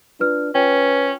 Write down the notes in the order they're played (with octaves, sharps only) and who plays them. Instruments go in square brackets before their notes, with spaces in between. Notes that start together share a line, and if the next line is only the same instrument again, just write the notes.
[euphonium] D4 [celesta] F4 B4 F6
[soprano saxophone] C#4 [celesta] F4 G5 [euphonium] B4